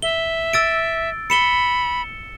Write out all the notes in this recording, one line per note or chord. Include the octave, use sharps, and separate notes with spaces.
E5 G7
E6 A6 D7
B5 C#7 E7 G7